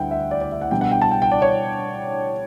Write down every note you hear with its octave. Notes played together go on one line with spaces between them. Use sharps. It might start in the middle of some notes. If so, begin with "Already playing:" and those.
Already playing: D2 D3 G3 E4 F#5 G5
E5
D5
D5
E5
F#5
B2 G3 D4 G5
F#5
G5
A5
G5
G5
D5
C#5